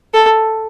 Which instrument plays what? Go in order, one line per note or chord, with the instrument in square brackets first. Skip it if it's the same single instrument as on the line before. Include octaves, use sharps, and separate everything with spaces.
[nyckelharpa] A4